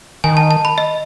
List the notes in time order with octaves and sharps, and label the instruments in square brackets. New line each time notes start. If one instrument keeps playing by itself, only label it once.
[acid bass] D#3 [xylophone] G#5
[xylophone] A5
A5
B5
D#5